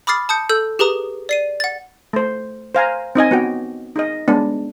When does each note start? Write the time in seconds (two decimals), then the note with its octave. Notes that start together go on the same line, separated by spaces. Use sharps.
0.07 B5 D6 D#6 F6 A6 C7
0.29 A5 D#6 G6 C#7
0.49 A4 E6 G6
0.79 G4 G#4 B4 A#5 D#6
1.29 D5 C7 D#7
1.60 F#5 A6
2.13 A3 C5
2.75 C5 F5 G#5 A#5
3.15 C4 D#4 D#5 G#5
3.31 B3 F#4 G5
3.96 D#4 G#4 D#5
4.28 G#3 B3 D4